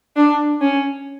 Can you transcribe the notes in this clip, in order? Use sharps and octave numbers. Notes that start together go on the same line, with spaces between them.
D4
C#4